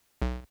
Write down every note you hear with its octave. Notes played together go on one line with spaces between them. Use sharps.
B1